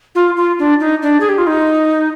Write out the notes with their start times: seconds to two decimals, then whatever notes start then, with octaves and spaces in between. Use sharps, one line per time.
0.15 F4
0.37 F4
0.59 D4
0.80 D#4
1.02 D4
1.20 G#4
1.29 G4
1.38 F4
1.47 D#4